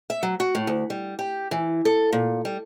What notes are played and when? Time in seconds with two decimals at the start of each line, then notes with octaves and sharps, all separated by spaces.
0.10 E5
0.23 F#3
0.40 F#4
0.55 A2
0.67 D2
0.90 G3
1.19 G4
1.51 E3
1.85 A4
2.13 A#2
2.45 G3